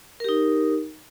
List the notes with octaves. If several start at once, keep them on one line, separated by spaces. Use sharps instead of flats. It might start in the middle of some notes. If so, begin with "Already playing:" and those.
D#4 G4 A#4